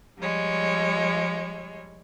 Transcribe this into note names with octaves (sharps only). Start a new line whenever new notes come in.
F3 G3 G#3 C#5